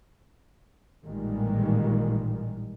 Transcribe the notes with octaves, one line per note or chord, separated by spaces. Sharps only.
A1 A#2 D#3 G3 G#3